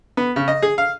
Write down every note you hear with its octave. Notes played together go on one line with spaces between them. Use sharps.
B3
C#3
D#5
G#4
F5